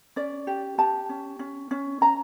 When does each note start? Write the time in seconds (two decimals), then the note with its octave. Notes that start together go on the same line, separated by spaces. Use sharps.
0.16 C#4 D5
0.47 G4
0.78 G4 A5
1.09 C#4
1.39 C#4
1.71 C#4
2.01 C#4 A#5